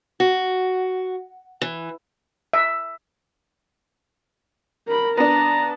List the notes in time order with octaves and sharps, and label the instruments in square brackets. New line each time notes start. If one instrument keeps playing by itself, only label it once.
[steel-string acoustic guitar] F#4
E3
[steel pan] E5
[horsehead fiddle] A#4 B5
[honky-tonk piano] B3 D4 [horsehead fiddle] A5 [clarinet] A#5